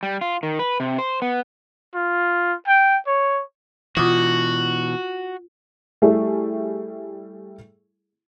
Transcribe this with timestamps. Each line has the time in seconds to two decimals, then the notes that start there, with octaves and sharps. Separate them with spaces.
0.03 G3
0.21 F4
0.43 D#3
0.59 B4
0.80 C3
0.98 C5
1.22 B3
1.95 F4
2.67 G5
3.07 C#5
3.97 B2 E3 F4 F#4 D6 D#6
6.02 G3 A3 E4 G#4 A4